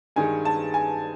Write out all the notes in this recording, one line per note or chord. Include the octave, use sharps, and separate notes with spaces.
G2 D#3 G#3 G#5
A5
G#5